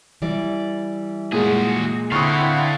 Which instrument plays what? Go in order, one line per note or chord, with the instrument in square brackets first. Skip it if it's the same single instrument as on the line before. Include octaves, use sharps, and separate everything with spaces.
[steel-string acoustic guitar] E3 G3 D5
[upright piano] A#2 G#3 [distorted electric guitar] F#4 G#4
[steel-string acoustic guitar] D3 [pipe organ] C4 E4 F#5 [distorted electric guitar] D5 F5 [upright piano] C#6 D#6